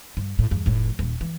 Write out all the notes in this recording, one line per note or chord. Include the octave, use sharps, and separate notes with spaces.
G2
A2
E2 G2
F1 A2
D#1
E3